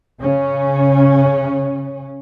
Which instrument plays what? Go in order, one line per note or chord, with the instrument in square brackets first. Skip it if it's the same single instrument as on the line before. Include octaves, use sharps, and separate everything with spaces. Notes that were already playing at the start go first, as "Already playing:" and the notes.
[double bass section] C#3 C#4